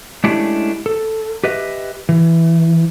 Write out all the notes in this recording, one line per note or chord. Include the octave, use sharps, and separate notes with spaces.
G#3 A3 C#4 D4 E4 G4
A4
G4 B4 D#5 E5
E3